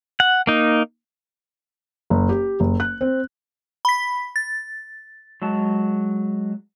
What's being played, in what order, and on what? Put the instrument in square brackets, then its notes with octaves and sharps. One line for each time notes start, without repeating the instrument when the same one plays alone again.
[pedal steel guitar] F#5
A#3 D#4
[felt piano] F#1
G4
F#1
F#6
C4
[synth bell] B5 B6
A6
[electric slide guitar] F#3 G#3 A5